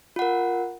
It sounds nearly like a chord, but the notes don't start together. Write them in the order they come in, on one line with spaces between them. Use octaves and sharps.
F4 F#5 A#4